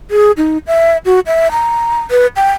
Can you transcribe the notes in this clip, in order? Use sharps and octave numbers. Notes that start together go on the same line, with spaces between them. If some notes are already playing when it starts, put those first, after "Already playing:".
G#4
D#4
E5
F#4
E5
A#5
B4
G5